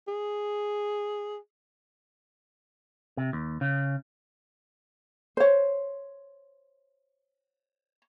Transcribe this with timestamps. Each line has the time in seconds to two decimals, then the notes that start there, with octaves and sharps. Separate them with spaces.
0.08 G#4
3.17 C3
3.33 D#2
3.61 C#3
5.37 C5 C#5